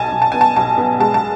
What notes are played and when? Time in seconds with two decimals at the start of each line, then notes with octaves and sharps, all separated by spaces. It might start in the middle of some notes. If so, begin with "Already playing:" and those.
Already playing: B1 G#5 A5
0.12 B1
0.22 A5
0.32 B3 G#5
0.41 A5
0.56 B1 A5
0.78 B3
1.00 G#3 A5
1.14 A5